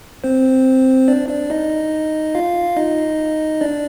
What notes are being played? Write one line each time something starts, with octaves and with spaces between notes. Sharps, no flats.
C4 C5
D4 D5
D4 D5
D#4 D#5
F4 F5
D#4 D#5
D4 D5